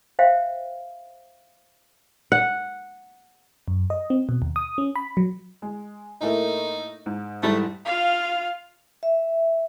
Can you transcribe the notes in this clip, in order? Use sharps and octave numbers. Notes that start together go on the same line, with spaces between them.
C5 E5 F5 G5
F#5
F#2
D#5
C4
B2
D#2
D#6
C#4
B5
F#3
G#3
A2 A3 A#3 D#4
G#2
G#2 E3 G3 A3
F4 F5
E5